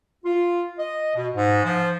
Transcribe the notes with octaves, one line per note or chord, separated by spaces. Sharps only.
F4
D#5
B2
G#2
F3